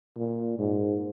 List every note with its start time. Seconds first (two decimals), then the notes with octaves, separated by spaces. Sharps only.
0.17 A#2
0.58 G#2